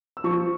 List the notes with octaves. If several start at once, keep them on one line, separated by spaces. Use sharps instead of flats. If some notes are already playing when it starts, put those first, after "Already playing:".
E6
F3 C#6